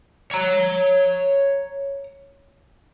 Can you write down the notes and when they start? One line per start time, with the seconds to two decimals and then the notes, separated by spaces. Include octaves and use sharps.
0.31 C#5 A#5